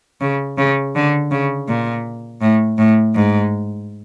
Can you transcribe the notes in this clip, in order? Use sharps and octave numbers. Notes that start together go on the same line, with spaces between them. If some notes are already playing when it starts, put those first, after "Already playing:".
C#3
C#3
D3
C#3
A#2
A2
A2
G#2